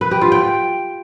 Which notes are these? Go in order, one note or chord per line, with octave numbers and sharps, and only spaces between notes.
B4
G4
F4
G5